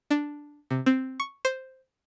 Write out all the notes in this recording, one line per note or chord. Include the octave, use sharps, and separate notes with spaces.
D4
C3
C4
C#6
C5